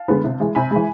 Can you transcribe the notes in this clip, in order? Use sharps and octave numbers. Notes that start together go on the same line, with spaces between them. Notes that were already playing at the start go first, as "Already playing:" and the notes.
Already playing: F5 A5
D3 G#3 B3
C3
E3 G#3
C3 G#5 B5
E3 G#3